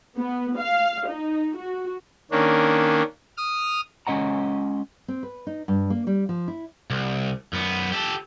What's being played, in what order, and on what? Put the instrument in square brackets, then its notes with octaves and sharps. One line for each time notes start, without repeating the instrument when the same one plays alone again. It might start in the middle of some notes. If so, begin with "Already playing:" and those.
[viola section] B3
F5
D#4
F#4
[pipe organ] D#3 A#3 C#4 D4
D#6 F6
[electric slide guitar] G#3 C#4 D#5 F#5 A#5
[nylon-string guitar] C4
B4
D#4
G2
A#3
G3
F3
E4
[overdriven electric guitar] C2
F#2 B3
G4 A4